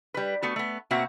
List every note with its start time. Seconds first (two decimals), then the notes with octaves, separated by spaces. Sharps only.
0.14 G3 B4
0.42 A3 B3 F#4
0.56 A3 B3
0.91 B2 A#3 C4 F#4 E5 F#5